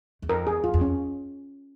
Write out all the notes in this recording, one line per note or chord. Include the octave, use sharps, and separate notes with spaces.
E2
F2 A#4
E2 G#4
F2 F4
F2
C#4